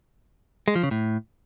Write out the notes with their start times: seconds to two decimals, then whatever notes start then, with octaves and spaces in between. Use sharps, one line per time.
0.68 G#3
0.75 F3
0.83 C#3
0.91 A2